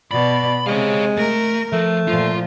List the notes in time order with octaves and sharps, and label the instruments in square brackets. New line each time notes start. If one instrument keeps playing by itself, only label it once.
[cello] B2 D5 [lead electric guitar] B5
[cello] C3 [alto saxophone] G#3 [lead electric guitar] C#5 F5
[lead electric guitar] A3 [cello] A#4
[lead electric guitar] F3 [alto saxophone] A3
[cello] A#2 F3 [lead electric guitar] F4